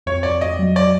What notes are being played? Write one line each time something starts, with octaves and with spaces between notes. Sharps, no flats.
F2 C#5
F2 D5
F2 D#5
F#3
D5